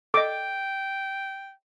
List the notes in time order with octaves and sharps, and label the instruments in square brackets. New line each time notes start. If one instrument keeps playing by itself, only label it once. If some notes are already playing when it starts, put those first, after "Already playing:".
[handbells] A4 D#5 [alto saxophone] G5 [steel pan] D6